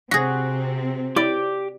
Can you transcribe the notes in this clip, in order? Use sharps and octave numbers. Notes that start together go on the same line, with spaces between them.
C3 C4 F#4 G#4 A#6
E4 G4 D5 D6